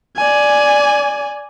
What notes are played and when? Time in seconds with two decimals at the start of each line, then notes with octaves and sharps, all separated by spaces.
0.17 D5 G#5